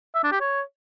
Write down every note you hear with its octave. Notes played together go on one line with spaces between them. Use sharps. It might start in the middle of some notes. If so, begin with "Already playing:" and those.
E5
D4
G4
C#5